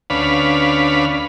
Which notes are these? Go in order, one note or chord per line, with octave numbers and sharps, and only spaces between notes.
D2 C#4 D4 B4 F5 B5